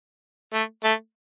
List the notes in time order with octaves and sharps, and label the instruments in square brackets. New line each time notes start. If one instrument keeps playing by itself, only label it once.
[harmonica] A3
A3